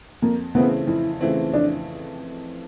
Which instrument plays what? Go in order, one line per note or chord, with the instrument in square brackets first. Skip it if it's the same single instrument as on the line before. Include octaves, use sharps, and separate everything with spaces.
[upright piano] F2 [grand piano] A#3
[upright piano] C#3 E3 A3 C4 [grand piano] B3
[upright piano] F2 [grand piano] E4
[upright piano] C#3 E3 A3 C4
[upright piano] F2 [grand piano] D4